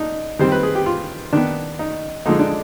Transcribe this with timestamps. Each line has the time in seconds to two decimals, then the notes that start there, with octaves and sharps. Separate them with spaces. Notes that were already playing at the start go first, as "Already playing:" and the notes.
Already playing: D4 D#4
0.39 D#3 G3 C4 C5
0.52 B4
0.63 G#4
0.75 G4
0.86 F4
1.33 D#3 B3 D4
1.79 D#4
2.26 D3 F3 G#3 D#4
2.39 D4